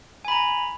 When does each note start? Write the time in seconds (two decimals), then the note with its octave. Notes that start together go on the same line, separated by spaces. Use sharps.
0.25 G#5
0.28 B5
0.32 A#5